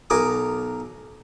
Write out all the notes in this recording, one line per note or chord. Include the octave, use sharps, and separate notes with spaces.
B1 A#4 G#5 D6 D#6